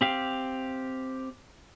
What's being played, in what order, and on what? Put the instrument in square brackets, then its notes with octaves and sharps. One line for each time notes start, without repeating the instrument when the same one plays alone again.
[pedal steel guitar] C4 G4 F5